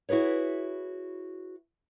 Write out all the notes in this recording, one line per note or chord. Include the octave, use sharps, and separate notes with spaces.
E4 F#4 G#4 B4 C#5